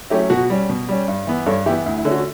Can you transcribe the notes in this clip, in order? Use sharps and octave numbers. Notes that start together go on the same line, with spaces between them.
F#3 A3 C#4 E4 G4
B2 F#4
G3 C#4
B2
G3 C#4
G2
E3 B3
G2 A4 C#5
E3 B3 E4 G4
D2 E4
E4
D3 A3 C#4
F#4